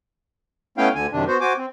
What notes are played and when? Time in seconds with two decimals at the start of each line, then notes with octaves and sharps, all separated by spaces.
0.78 A3 B3 C#4 E4 F5 G5
0.95 D2 D3 G#5
1.12 F#2 C3 D#3 D4
1.28 B3 F#4 C5
1.41 F#4 C5 G#5 D6
1.57 C4